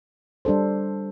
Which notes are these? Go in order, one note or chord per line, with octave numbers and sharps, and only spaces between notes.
G3 D4 A4 C5